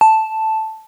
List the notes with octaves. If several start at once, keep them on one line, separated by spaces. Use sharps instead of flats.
A5